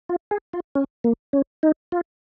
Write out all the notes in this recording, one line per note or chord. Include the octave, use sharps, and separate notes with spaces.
F4
G#4
F4
C#4
A#3
C#4
D#4
F4